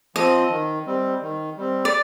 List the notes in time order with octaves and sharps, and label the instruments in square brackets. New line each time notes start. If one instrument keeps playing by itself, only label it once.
[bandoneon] F3 C4 [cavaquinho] D#5
[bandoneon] D#3
G3 C4
D#3
G3 C4
[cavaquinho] D5